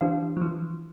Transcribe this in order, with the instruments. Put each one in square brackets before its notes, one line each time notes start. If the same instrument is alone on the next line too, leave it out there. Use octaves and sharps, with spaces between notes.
[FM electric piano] E3 [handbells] D4 G4 C5 F5
[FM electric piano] F3
E3